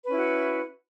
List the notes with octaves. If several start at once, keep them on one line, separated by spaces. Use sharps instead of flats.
C#4 E4 F#4 B4